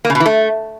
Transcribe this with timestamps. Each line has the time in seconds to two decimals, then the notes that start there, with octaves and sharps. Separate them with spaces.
0.05 A#3
0.10 C#3
0.15 B2
0.20 E3
0.26 A3